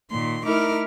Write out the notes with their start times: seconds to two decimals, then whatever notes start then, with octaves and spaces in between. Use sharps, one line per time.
0.11 A#2 D#3 C6
0.45 A3 D#4 E4 A#4 D6 F6